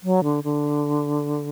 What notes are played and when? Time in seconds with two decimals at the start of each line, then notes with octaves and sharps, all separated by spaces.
0.03 F#3
0.24 D3
0.44 D3